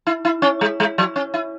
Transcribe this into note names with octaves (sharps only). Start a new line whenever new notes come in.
E4
E4
C#4
G#3
G#3
F#3
C#4
E4